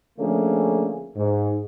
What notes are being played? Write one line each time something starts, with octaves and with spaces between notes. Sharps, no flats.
D3 F3 A3 A#3 C#4 G#4
G#2